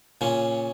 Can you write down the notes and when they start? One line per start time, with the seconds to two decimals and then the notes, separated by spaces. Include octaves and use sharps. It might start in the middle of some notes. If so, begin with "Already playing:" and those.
0.21 A#2 C#3 C#4